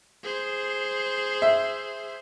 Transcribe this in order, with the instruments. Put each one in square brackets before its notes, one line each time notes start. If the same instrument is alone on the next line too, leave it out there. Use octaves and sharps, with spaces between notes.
[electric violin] G#4 C5
[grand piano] E5